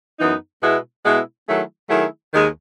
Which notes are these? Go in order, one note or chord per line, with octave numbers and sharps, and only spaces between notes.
F#2 E3 B3 D#4
B2 G#3 B3 E4
B2 G#3 B3 E4
D#3 F#3 A3 E4 G#4
D#3 F#3 A3 E4 G#4
D#2 D#3 G#3